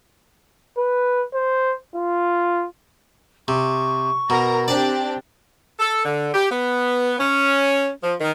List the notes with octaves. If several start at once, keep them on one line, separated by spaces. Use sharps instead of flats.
B4
C5
F4
C3 C#6
B2 A#4 A#5
C4 D4 G4 D5 A5
A4
D3
G4
B3
C#4
F3
D#3